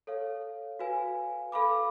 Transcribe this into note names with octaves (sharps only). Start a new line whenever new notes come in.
A4 C#5 F5
F#4 B4 F5 G#5
A4 F5 B5 D6